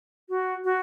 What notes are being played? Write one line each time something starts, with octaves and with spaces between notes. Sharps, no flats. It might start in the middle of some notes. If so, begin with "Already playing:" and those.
F#4
F#4